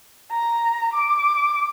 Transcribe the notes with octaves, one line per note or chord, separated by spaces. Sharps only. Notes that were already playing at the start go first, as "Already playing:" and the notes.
A#5
D6